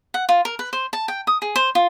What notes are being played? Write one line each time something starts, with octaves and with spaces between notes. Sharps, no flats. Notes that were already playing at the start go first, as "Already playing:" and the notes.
F#5
F4
A#4
B4
C5
A5
G5
D#6
G#4
C5
F4